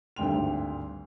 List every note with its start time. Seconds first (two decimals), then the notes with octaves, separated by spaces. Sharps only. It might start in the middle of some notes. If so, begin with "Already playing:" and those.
0.16 G#1 D2 G2 G5 C6 F7